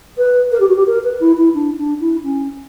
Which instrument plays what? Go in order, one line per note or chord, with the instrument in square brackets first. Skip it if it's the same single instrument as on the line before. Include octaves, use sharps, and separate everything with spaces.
[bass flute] B4
A#4
G4
F#4
G4
A#4
B4
E4
E4
D4
D4
E4
C#4